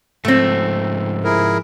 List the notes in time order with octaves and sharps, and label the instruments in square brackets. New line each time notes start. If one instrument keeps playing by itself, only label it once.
[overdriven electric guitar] G#2 F3 [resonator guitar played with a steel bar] A3 C4
[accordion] E4 G#4 A#4